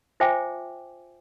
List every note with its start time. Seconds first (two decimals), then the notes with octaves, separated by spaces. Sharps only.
0.20 F4 C5 E5 G5 G#5 D6